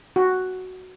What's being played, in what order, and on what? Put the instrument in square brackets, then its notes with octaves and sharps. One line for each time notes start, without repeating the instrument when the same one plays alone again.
[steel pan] F#4